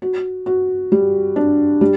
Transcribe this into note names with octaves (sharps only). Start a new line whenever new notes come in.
F#4
F#4
G3
D4
G3